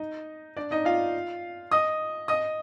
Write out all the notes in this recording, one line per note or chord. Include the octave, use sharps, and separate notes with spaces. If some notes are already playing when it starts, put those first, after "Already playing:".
Already playing: D#4 D#5
D4 D5
D#4 D#5
F4 F5
D#5 D#6
D#5 D#6